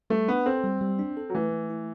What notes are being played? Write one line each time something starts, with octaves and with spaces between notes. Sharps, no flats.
G3 A3
B3 D4
C4 A4
G3
G3
D4
A4
F#3
E3 A3
A3
E4